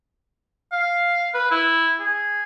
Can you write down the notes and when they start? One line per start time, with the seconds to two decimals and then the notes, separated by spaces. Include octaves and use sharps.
0.72 F5
1.34 B4
1.51 E4
2.00 G#4